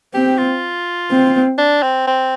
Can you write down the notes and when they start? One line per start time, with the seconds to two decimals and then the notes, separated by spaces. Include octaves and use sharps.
0.14 C4 G4
0.38 F4
1.11 C4
1.58 D4
1.83 C4
2.07 C4